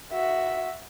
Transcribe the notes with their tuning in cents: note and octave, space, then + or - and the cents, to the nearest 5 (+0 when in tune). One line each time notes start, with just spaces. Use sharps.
F#4 +0 E5 +0